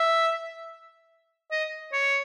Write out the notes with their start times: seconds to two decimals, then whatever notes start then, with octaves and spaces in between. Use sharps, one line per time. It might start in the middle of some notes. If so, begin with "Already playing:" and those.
Already playing: E5
1.51 D#5
1.93 C#5